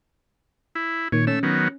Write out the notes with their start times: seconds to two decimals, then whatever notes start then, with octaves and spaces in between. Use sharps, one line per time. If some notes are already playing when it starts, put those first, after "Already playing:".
0.75 E4
1.12 A#2 D#3 C#5
1.27 A3 C#4 E6
1.43 D#3 F#3 B3